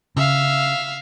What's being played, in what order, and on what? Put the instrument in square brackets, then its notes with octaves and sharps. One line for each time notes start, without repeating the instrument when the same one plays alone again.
[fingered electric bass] C#3 [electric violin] E5 F5